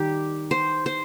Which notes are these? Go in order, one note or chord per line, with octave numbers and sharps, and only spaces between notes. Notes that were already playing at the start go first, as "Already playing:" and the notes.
Already playing: D#3 G3 G4
C5
C5